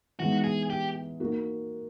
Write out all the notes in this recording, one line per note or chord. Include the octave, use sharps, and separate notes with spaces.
E3 G#3 B3 D#4 F#4
G#4
G4
A#3 D#4 F#4